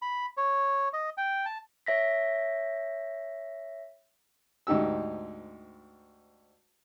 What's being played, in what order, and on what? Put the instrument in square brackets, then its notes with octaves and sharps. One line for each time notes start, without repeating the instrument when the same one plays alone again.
[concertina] B5
C#5
D#5
G5
A5
[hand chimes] C#5 E5 A#6 B6
[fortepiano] D2 G#2 D#4 G4 E6